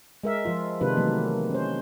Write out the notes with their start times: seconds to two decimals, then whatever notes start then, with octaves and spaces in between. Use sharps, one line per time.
0.24 G#3 A#4 E5
0.45 F3 F4
0.81 C3 D#3 G#3 D4 F4 B4
0.96 D#3 E3 F#3 A3 A#3
1.50 C#4 C5